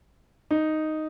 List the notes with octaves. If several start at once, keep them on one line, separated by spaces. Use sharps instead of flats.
D#4